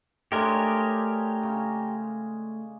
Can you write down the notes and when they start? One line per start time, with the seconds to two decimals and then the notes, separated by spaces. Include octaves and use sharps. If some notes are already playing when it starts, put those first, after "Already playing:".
0.32 G#3 A3 D4 G4 G#4 A#4 C#5
1.43 C#3